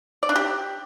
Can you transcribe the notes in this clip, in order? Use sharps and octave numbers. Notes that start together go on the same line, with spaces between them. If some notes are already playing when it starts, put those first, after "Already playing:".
D5
D4
G4